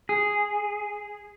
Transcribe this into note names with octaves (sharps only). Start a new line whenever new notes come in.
G#4